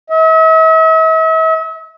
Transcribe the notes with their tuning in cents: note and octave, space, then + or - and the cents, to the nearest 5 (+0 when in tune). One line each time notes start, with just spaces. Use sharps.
E5 -45